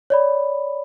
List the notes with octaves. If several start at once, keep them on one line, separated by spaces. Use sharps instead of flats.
C#5 D5 B5